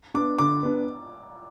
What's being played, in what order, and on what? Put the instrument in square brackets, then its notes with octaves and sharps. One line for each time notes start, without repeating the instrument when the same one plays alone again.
[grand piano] B3 D4 [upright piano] D6
[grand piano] D3 [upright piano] D6
[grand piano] B3 D4